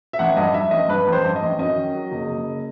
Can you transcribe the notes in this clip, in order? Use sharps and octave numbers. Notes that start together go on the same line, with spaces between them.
E5
A1 F#5
G2 D#5
G2 E5
A1 D#5
G2 B4
A1
C5
G2
D#5
A1
F#2 D#5
D#3
F#3
F#1
F#1